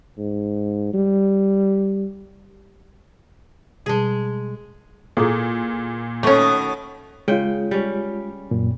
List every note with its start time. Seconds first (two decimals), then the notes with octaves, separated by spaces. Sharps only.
0.18 G#2
0.94 G3
3.86 B2 G3 G#3 G#4 A5
5.17 A#2 E4 G#4 A4
6.23 B2 D#3 A3 C#4 C#6
7.28 C#3 G#3 F4 G5
7.71 G3 C#4
8.51 F#2 A#2